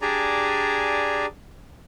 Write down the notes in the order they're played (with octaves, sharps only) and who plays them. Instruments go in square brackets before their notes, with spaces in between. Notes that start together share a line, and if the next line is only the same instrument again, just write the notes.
[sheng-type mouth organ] D4 G4 G#4 D5 G#5 A#5